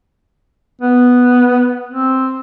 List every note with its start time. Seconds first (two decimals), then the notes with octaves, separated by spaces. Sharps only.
0.81 B3
1.89 C4